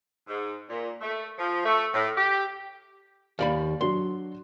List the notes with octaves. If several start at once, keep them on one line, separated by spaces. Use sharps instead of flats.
G#2
A#2
A3
F3
A3
A2
G4
D#2 D5 F5 B5
F#3 D4 F#4 C6